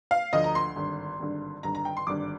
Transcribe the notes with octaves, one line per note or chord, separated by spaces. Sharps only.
F5
D2 D3 F3 D#5
A#5
C6
G#1 G2 D3
G#1 G2 D3
G#1 G2 D3 A#5
A#5
G5
C6
G#1 G2 D3 D6